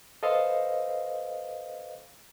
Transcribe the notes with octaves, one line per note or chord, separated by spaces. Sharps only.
A4 B4 C5 D#5 F5